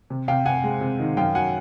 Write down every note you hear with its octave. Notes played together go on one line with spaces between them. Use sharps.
C3
C3 F5 G5
C3 F#5 G#5
G#3
C3
D#3
F#2 F5 G5
F#3 F#5 G#5